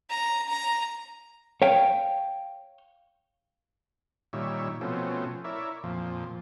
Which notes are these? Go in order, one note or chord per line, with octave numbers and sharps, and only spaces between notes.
A#5
A#5
C#5 F5 G5
A#2 D#3 G3 C#5 E5
B2 F3 A3 C4 C#4
E4 A#4 C#5 D5 E5
F2 A#2 F3